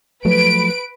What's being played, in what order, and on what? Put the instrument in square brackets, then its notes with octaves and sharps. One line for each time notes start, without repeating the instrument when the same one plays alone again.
[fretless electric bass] F3 F#3 A3 [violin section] B4 D7